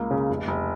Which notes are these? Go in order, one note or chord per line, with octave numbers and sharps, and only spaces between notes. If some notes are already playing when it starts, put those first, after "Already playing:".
Already playing: C#2 A#3
C#3
F1
F1